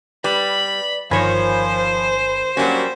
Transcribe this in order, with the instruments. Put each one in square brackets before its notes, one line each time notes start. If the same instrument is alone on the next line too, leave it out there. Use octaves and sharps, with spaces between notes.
[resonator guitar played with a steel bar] G3 [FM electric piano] B4 D5 [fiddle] B5
[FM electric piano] G1 G#5 B5 [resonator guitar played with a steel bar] D#3 C#5 [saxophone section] F3 [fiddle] C5
[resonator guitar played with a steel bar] F#3 G3 C#4 [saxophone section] A#3 F#4